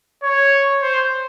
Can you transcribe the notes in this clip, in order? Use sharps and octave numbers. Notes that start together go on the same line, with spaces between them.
C#5
C5